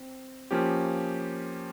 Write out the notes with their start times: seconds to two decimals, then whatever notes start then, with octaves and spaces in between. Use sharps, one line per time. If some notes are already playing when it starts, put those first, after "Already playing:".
Already playing: C4
0.51 F3 A#3 C#4 G4